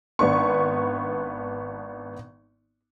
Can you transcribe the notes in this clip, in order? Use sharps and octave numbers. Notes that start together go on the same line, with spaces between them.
G#1 B3 D4 B4 C#6